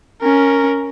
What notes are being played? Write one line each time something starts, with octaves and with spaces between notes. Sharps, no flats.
C#4 A#4